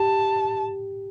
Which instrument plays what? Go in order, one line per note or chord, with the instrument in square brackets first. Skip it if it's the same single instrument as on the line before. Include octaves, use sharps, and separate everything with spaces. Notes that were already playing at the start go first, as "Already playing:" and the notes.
Already playing: [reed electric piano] G4 [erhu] A5